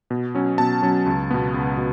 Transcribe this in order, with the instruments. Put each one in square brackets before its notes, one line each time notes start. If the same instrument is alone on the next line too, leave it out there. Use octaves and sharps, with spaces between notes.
[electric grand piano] B2
F#3 C#4
B2 A5
F#3 C#4
C#2
B2 B3
C#2
B2